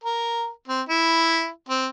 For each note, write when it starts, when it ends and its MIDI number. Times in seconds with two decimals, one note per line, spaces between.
0.03 0.50 70
0.68 0.82 60
0.89 1.49 64
1.69 1.87 60